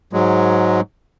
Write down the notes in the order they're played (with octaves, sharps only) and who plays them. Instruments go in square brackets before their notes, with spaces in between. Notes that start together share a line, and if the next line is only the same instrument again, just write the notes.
[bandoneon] G#2 F#3 G#3